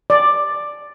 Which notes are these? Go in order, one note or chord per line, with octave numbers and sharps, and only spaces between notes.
D5